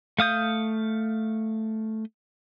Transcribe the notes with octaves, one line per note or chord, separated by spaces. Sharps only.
A3 F5 D#6 G6